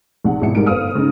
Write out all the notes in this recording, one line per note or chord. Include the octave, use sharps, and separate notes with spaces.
A#1 C3 D#4 F#5
G#1 B2 E4 C#7
G#2 G3 A#4 D7
G1 C4 B4 F5 D#6 F6
C#3 G#3 D#4